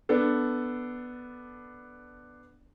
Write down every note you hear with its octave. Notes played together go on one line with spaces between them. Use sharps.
B3 D4 A4